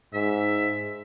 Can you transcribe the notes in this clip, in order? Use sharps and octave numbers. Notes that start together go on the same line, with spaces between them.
G#2 E5